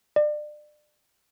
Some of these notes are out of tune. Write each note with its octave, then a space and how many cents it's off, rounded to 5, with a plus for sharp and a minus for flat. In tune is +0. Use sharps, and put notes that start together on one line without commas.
D5 +30